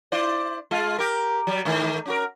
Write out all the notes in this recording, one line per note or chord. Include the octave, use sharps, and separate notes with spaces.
E4 C5 D5
G#3 F4
G4 A#4
F#3 G3
G#2 D#3 A3
C#4 F#4 A#4